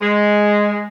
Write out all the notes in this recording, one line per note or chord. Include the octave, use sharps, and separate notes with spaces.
G#3